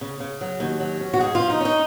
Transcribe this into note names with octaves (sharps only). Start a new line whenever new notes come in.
C#3
C#3
F#3
D#2
F#3
C#4
F#4
G#2 G#4
F3 F4
D#4
C#4 D#4